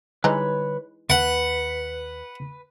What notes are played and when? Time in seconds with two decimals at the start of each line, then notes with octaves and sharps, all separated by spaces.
0.24 D3 E3 G3 G#3 D#4 B4 C#5 B5
1.10 D#2 B4 F#5